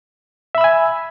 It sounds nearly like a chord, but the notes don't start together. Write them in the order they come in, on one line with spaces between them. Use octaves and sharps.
E5 B5 E6 G#5